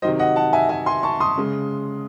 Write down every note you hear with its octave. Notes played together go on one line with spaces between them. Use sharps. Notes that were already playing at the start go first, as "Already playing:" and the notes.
C3 D#3 F#3 C5 D#5
D#5 F#5
F#5 A5
E5 G#5
E5 G#5
G#5 C6
A5 C#6
C6 D#6
C#3 G#3 C#4